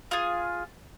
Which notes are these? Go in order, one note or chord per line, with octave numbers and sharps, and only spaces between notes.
F4 G#4